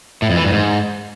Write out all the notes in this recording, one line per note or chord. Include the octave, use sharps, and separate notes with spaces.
A2
F2
E3
G2
G#2